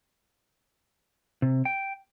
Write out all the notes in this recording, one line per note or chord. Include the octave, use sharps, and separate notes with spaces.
C3
G5